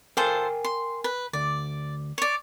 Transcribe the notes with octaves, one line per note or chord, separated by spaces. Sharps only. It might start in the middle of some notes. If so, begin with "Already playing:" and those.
F4 A4 A#4 C5 G5 G#5
C6
B4
D2 D5
C#5 D5